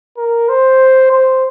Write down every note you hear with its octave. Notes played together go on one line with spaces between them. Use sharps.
A#4
C5
C5